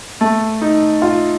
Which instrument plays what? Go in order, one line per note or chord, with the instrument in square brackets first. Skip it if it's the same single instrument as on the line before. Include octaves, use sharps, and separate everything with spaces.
[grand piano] A3
D#4
F4